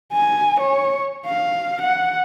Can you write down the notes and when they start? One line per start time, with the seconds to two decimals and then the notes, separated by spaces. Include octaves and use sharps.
0.13 G#5
0.60 C#5
1.27 F5
1.81 F#5